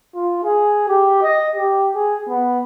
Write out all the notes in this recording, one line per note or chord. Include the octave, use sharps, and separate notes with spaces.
F4
G#4
G4
D#5
G4
G#4
B3